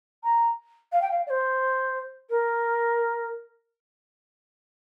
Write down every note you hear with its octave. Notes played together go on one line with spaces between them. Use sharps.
A#5
F5
G5
F5
D5
C5
A#4